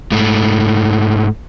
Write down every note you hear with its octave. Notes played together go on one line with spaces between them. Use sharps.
G#2 A3